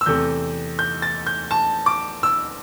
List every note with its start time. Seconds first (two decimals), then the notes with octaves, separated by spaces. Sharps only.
0.01 E6
0.06 E2 C3 A3 G6
0.79 G6
1.02 A6
1.27 G6
1.51 A5
1.86 D6
2.23 E6